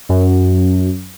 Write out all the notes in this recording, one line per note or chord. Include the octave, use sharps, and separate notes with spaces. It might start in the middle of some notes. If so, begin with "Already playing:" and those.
F#2